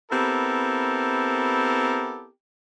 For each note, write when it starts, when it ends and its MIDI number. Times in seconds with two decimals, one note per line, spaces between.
0.11 2.28 59
0.11 2.28 60
0.11 2.28 64
0.11 2.28 67
0.11 2.28 69
0.11 2.28 70